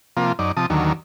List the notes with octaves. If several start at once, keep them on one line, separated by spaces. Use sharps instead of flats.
C3 F3 A#3 F4
F#2 D#4 D5
C3 F3 A5 D#6
D#2 D3 D#3 F#3